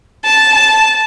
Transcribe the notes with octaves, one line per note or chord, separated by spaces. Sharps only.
A5
A5